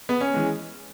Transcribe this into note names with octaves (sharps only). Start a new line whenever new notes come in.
B3
C#4
E3 G#3